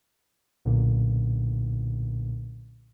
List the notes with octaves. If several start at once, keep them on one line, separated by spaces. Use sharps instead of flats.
B1 A#2 D3